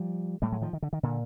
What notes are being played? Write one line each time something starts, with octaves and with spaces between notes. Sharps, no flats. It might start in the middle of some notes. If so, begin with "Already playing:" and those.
Already playing: F3 G3
A2 G3 A3
F#3 G#3
D#3 F3
D#3
D3
D#3
A#2 D3